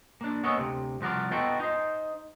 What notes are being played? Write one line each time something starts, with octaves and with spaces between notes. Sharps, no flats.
A#3 D4
A#3 B3 C#4 E4 C#5 D#5
D2 C3
C2 F3 F#4 A#4 D5
B3 D#4 F4 F#4 A4 G5
D#4 C5